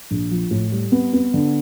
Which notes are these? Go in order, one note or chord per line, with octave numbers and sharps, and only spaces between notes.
A#1
F3
A2
G3
B3
B3
D3